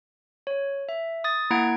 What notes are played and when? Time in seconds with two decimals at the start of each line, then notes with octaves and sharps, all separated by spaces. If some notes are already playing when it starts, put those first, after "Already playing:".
0.47 C#5
0.89 E5
1.24 D#6 A6
1.50 A#3 E4 F#5 A#5 G#6 D7